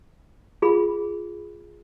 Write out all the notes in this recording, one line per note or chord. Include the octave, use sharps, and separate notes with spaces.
F4 G#4 B5